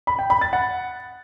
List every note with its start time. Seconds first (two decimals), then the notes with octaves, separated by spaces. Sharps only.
0.07 B5
0.19 G5
0.30 B5
0.41 A6
0.53 F#5